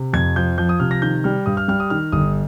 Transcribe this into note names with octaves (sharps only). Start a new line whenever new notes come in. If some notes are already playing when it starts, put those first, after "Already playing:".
Already playing: C3
F2 G#6
F3 G6
F3 G6
D#6
C3 F6
A#6
D#3 G6
G3 F6
G2 D#6
F6
G3 F6
D#6
D#3 F6
G1 D#6